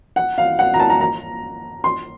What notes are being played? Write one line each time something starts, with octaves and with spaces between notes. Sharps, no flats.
F#5
F5
F#5
A#5
A5
A#5
A#5
C6